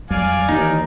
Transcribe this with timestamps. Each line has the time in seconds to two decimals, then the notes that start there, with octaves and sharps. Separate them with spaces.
0.11 F2 F#3 G3 D5 F5 G#5
0.49 D#2 E3 A#3 D#4